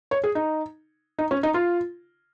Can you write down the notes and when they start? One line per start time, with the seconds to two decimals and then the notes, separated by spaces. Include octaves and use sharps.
0.11 C#5
0.24 G#4
0.35 D#4
1.19 D#4
1.31 C#4
1.43 D#4
1.54 F4